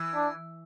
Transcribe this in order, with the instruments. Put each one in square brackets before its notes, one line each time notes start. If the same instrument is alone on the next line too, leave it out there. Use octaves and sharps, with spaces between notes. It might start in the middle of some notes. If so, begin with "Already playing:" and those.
Already playing: [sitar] E3
[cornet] D4